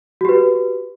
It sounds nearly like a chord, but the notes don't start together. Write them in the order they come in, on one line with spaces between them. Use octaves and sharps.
F#4 G4 B4